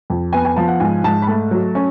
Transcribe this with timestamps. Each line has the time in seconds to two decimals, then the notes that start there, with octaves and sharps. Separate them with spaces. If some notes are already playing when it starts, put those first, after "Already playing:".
0.10 F2
0.33 B3 G#5
0.45 G#5
0.56 F3 A5
0.68 F#5
0.80 G#2 G#5
1.04 G#2 A5
1.22 B5
1.27 A3 A5
1.51 F#3
1.75 C#4